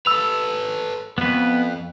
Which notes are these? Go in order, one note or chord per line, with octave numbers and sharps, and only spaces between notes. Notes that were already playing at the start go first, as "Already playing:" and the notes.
A4 B4 E6 F7
F2 B3 B4